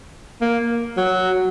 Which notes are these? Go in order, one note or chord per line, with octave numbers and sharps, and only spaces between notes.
A#3
F#3